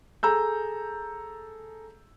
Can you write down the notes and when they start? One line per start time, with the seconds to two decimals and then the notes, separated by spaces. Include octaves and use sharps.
0.23 G#4 A4 A#5 E6 G6